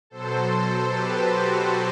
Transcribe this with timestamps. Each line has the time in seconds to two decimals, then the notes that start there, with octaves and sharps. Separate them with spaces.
0.10 B2 F#3 A4 C5
0.90 G4 B4
1.29 F#4 A4